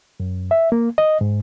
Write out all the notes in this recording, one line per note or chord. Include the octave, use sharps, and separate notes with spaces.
F#2
E5
A#3
D#5
G#2